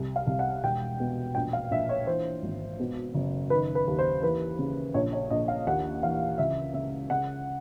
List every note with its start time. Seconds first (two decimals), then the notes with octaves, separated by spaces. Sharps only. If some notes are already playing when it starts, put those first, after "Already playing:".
Already playing: C2
0.16 F5
0.27 C2
0.39 F#5
0.63 E1 G5
1.00 B2
1.35 A#1 G5
1.53 F5
1.71 A#1 E5
1.89 C#5
2.07 E3 C5
2.43 G#1
2.79 B2
3.14 F#1
3.50 D#3 B4
3.75 B4
3.87 D#2
3.99 C5
4.22 E3 B4
4.59 C#3
4.94 A#1 C#5
5.13 C#5
5.30 A#1 D#5
5.48 F5
5.67 D#2 F#5
6.03 E3 F5
6.38 C#2 E5
6.74 C#3 E5
7.10 C#3 F#5